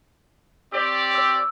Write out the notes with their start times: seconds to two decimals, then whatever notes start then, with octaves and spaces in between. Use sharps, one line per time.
0.72 C4 G4 C#5 D5 E6
1.15 C#5 E6